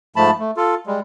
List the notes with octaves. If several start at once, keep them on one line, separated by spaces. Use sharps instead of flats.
G#2 F3 A3 A5 B5
A3
F4 A4
G3 G#3